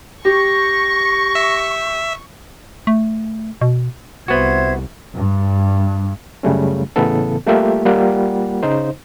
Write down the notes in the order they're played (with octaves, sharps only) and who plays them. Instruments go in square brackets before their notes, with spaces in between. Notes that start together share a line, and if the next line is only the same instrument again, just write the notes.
[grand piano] G4 [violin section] C#6 [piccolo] A#6
[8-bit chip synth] E5
[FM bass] A3
B2
[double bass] C2 [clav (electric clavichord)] B3 F#4 [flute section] C5 E5 G#6
[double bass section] G2
[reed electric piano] F#2 C#3 G3 A3 C#4
A2 C#3 E3 B3 A4
G3 A3 A#3 F4 G4 E5
G3 A#3 F4 F#5
C#3 D#4 C5